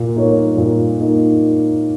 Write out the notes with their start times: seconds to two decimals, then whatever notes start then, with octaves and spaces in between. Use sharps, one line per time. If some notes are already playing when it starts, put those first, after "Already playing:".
Already playing: A#2
0.16 A#3 D#4 A#4 C#5
0.57 A#2
1.00 A#3 D#4